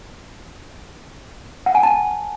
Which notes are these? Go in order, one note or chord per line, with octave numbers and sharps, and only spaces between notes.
F#5
G#5
A5